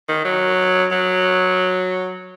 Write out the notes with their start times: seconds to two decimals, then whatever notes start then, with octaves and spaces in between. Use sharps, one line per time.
0.09 D#3
0.25 F#3
0.91 F#3